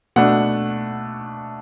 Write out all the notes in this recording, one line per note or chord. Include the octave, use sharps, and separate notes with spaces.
B2 A3 D4 F#5